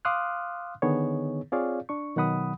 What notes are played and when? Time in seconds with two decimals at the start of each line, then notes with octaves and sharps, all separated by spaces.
0.05 F5 C6 D6 D#6 F6 F#6
0.82 D3 D#3 B3 D#4 G#4 C#5
1.52 C4 F4 G#4 C#5 D5 F5
1.89 D4 C#6
2.16 B2 D#3 F#3 F#5 B5 D#6